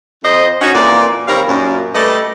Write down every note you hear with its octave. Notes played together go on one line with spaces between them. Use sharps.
F2 C5 D#5
C#4 D#4 F#4
F2 A#2 E3 A#3 D5
D#2 G3 C4 A#4 C#5 F5
F#2 A#2
G3 A3 A4 B4 D5 D#5